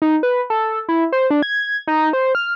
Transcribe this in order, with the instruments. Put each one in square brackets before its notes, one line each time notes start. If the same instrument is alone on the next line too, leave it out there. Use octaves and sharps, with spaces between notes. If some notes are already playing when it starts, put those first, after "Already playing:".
[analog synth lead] D#4
B4
A4
E4
C5
D4
G#6
D#4
C5
F6